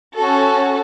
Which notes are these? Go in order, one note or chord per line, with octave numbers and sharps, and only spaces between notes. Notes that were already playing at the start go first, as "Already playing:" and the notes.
C#4 F#4 A4